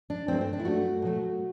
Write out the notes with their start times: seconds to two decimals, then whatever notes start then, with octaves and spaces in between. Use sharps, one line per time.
0.10 D4
0.28 G2 F#3 A3 C4
0.41 C4
0.53 D4
0.60 E4
0.65 G2 F#3 A3 F#4
1.02 B2 F#3 A3